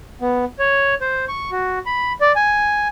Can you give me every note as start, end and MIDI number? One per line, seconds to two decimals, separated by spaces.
0.21 0.45 59
0.59 0.94 73
1.01 1.25 72
1.28 1.50 85
1.51 1.79 66
1.86 2.13 83
2.21 2.32 74
2.36 2.88 80